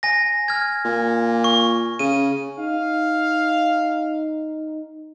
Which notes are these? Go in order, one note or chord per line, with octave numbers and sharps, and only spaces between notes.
G#5 A#6
F6 G#6
A#2
C#6
C#3 D#7
D#4 F5